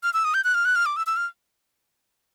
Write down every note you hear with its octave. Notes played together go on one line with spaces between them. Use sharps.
F6
E6
D#6
G6
F#6
F6
F#6
F6
D6
E6
E6
F6